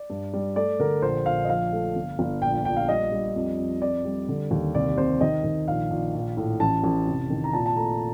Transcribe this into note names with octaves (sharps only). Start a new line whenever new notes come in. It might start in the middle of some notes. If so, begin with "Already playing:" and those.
Already playing: D5
G2
G3
A3 D5
D3 A#4
A#1 C5
A#1 F5
D#5
F3 F5
A3
G1
G1
A#1 G5
A#1 G5
F5
G3 D#5
G3
F2
F2
F2 D5
G3
D3
D#2
C2 D5
C3 C5
D#3 D#5
D#3
A#1 F5
A#1
A#1
A2
A1 A5
A1
F1
D#3
A#5
A#2 A5
A5
A3 A#5